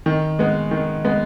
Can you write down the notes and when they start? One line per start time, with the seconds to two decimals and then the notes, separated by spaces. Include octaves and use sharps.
0.06 D#3
0.39 G#3 B3
0.71 D#3
1.05 G#3 B3